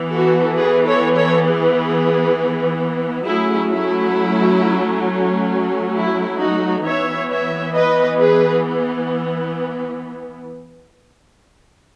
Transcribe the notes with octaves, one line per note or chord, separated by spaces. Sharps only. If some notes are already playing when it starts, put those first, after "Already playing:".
Already playing: E3 B3
F#4 A4
G#4 B4
A4 C#5
A4 C#5
G#4 B4
F#3 A3 C#4 E4 G#4
E4
E4
D#4 F#4
E3 B3 C#5 E5
C#5 E5
B4 D#5
G#4 B4